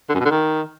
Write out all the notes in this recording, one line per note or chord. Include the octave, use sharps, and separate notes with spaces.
D3
F#2
B2
D3
D#3